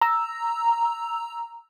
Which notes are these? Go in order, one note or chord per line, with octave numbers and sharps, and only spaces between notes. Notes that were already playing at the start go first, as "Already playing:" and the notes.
A#5 E6